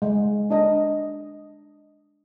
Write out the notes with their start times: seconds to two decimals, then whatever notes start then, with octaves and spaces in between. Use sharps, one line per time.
0.02 G#3
0.50 D4 D#5